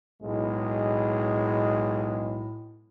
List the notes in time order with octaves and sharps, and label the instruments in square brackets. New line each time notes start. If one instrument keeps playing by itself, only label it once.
[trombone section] B1 G#3 [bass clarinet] A2